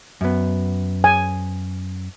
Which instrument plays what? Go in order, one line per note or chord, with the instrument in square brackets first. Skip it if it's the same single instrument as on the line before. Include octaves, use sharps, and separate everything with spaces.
[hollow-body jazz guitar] F#2 B3
[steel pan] G#5